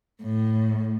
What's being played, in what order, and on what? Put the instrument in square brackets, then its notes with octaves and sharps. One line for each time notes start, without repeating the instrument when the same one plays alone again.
[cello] A2